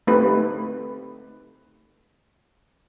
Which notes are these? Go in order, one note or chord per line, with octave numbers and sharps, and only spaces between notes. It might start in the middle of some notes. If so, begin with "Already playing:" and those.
A3 C4 D#4 G4 B4